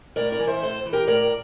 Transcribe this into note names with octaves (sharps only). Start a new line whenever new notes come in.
A2 A#4 D5
A#4 D5
E3
C5 E5
A2 A4 C5
E3
G4 A#4
A2 A#4 D5